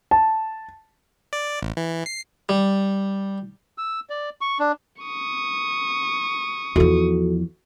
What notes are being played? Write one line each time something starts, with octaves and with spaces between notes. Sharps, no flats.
A5
D5
A1
E3
C7
G3
E6
D5
C#6
D4
C#6 D#6
E2 F3 F#4 A4